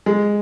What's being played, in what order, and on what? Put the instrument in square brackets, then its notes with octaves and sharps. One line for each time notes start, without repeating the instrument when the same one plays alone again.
[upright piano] G#3